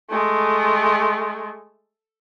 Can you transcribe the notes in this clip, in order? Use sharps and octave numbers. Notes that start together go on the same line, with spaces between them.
G#3 A3